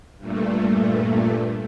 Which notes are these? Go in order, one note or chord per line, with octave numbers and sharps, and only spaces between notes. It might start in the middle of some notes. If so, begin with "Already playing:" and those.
G2 A#2 A3